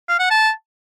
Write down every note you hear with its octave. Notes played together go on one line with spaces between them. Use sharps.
F5
F#5
A5